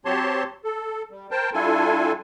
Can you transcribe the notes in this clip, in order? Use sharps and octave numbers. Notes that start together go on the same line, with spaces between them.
F#3 C4 G4 C#5 A5 C6
A4
G3
A#4 C5 G5 A5
G3 D4 E4 F4 A4 G#5